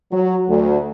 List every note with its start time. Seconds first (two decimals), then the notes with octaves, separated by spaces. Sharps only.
0.12 F#3
0.48 D2